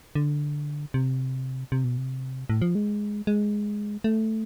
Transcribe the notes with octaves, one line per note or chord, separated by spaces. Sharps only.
D3
C3
C3
B2
C3
A2
F3
G#3
G#3
A3